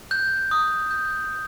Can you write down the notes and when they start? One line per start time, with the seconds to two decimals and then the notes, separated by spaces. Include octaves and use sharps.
0.11 F#6 G6
0.51 D#6
0.91 G6